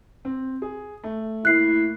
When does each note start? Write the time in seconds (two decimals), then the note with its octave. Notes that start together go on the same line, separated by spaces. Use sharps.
0.25 C4
0.62 G#4
1.04 A3
1.45 A2 A#3 E4 F#6 C7